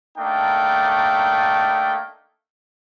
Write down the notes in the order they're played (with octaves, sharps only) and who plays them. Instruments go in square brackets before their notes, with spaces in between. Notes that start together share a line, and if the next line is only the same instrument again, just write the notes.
[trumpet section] A3 A#3 D4 D#4 G5